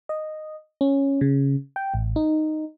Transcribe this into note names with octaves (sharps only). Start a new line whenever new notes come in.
D#5
C#4
C#3
G5
A1
D#4